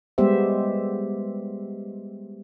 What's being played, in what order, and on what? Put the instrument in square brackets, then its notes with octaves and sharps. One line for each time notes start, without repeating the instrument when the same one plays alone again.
[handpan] G3 G#3 B3 G4 C5 E5